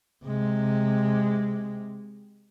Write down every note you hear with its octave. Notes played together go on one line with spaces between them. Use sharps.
C3 G#3